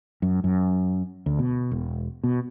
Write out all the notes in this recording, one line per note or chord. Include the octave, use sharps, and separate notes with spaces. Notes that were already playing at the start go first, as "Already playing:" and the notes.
F#2
F#2
D2
B2
E1
B2